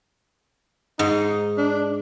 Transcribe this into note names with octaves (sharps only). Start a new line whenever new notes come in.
G#2 D#4
D4